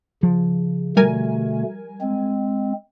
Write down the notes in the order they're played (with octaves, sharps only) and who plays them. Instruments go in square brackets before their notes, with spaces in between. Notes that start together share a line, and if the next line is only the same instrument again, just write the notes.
[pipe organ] C#3 [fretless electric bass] F3
[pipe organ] B2 D3 A3 [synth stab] G3 A#4 G#5
[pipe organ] G#3 C4